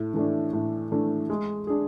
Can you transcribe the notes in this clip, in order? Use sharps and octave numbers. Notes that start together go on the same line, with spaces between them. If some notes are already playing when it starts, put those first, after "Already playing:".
Already playing: A2
E3 A3 D4
A2
E3 A3 D4
G#3
D4 G#4